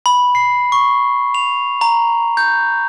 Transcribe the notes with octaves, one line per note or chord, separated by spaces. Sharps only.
B5
C7
C#6
F7
A#5
G6